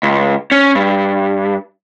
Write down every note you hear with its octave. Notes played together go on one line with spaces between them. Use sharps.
C#2
C#4
G2